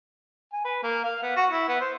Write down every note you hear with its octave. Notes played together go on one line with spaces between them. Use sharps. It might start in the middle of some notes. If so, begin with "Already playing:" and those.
G#5
B4
A#3
F5
B3
F#4
E4
B3
C5